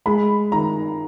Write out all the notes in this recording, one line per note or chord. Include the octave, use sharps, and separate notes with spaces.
G#3 B5
D#3 A#5